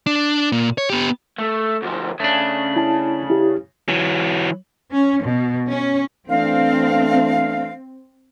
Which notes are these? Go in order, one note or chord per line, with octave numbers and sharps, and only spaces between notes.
D4
A#2
C#5
B3 G4
A3
D2 F3
C#3 A3 D4
E4 A5
E4 G4
E3 F#3
C#4
B2
C#4
E3 A3 C4 D4 F5